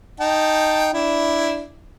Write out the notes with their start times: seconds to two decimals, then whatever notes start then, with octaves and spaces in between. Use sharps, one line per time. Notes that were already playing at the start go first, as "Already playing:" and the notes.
0.20 D#4 G5 A5
0.93 D4 E4